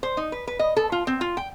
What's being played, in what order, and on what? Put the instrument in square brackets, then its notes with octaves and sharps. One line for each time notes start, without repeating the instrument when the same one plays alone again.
[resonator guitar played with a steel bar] C5
D#4
B4
B4
D#5
A4
F4
C4
F4
G5